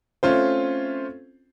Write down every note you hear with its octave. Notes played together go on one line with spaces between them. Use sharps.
A3 C4 C#4 F4 C5